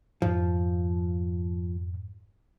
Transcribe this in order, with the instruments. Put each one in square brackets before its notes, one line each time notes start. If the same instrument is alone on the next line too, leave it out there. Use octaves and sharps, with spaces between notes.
[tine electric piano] F2 G#2 [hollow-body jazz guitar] F3